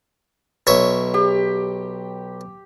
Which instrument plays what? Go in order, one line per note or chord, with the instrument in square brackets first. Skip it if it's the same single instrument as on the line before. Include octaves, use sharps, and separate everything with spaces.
[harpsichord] B1 C#5 E5
[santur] G4